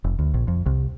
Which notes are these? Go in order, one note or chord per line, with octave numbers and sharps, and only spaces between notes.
F1
D2
A#1
F2
C2